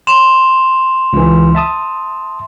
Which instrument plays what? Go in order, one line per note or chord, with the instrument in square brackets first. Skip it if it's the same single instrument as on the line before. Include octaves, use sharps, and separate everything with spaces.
[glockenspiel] C6 E7 F7
[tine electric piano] C#2 E3
E5 A5 D#6